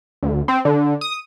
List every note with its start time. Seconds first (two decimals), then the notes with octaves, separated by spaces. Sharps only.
0.23 D2
0.48 C4
0.65 D3
1.01 D#6